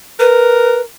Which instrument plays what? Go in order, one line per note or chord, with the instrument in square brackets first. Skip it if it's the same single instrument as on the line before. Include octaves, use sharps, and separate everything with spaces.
[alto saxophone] A#4 [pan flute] B4